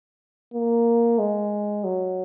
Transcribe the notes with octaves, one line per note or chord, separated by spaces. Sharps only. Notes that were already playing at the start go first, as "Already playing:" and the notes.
A#3
G#3
F#3